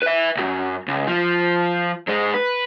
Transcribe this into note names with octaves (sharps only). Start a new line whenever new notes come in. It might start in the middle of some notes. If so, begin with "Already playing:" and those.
B4 E5
C2 F#2
C#2
F3
G#2 G#3
B4